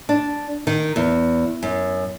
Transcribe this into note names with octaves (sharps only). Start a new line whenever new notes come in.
D4
D#3
E2
F#2